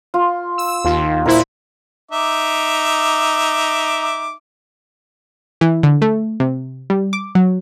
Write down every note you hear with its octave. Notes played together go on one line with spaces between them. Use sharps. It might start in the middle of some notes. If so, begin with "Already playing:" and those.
F4
E6
D#2 F4
A#2 E4 A#4 C5 B5
D#4 E5 D6
E3
D3
A3
C3
G3
D6
F#3